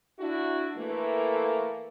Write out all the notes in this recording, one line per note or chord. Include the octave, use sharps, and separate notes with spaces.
D4 E4 F#4
E3 A3 A#3